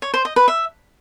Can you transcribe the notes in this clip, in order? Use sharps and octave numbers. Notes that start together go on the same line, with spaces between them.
C#5
C5
D#5
B4
E5